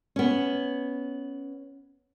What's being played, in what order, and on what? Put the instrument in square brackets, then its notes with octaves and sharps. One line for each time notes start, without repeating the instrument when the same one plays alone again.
[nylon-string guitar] B3 C#4